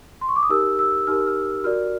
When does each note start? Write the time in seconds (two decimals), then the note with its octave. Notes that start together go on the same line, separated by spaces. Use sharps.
0.21 C6
0.28 C#6
0.36 D6
0.43 D#6
0.49 D#4 G4 A#4 E6
0.79 E6
1.07 D#4 G4 A#4 F6
1.27 F6
1.64 F#4 A#4 D5 F6